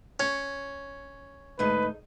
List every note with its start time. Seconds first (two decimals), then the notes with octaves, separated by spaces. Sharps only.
0.20 C#4 C#5
1.59 D2 G#2 D#4 B4